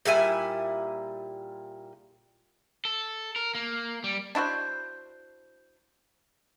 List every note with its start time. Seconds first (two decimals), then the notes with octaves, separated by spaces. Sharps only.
0.05 A#2 G3 E4 G#5
2.85 A4
3.36 A#4
3.55 A#3
4.04 G3
4.35 D4 E4 F#4 C5